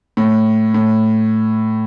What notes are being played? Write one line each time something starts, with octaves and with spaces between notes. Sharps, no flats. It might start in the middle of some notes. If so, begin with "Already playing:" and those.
A2
A2